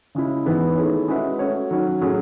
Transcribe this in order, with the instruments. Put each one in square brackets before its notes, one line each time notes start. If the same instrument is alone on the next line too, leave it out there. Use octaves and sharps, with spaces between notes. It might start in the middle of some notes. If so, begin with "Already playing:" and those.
[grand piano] C#3 G#3 C#4 E4
G#2 E3 B3
D#3 A3 E4 G#4 C#5
G#3 C#4 F#4 B4 E5
A3 C#4 F#4 C#5
D#3 F#3 C#4 F#4 C#5
A2 F#3 C#4 G#4